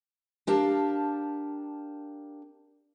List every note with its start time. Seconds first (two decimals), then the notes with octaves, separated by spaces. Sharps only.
0.47 D4 G4 A#4 F5 A5